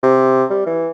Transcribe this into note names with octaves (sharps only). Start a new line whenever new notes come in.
C3
G3
E3